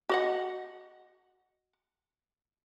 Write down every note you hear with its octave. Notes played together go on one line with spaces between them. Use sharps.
F#4 D#5 F#5